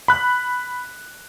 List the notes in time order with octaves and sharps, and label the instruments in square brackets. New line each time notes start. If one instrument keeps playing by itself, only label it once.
[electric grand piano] B5 F#6